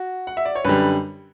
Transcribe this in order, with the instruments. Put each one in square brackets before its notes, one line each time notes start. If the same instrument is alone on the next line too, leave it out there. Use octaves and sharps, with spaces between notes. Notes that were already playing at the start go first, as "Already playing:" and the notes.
Already playing: [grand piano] F#4
F#5
E5
D5
C#5
F#2 D3 G3 B4